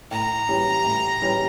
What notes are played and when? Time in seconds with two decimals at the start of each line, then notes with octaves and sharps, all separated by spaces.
0.11 A2 A#5
0.48 E3 G3 C#4 G4
0.84 A2
1.22 E3 G3 C#4 G4